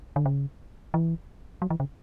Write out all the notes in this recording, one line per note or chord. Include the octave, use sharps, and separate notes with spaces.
D3
C#3
E3
F#3
E3
C#3